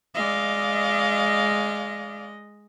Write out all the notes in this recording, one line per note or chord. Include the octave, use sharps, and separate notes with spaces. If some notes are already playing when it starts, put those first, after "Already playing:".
G#3 D5 D#5 F5